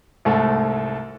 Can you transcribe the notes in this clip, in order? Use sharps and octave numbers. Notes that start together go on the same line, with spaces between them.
C2 G#2 A3